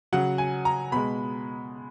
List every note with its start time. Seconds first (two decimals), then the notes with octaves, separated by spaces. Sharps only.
0.12 C#3 F#3 F#5
0.38 G#5
0.65 A#5
0.92 B2 G#3 B5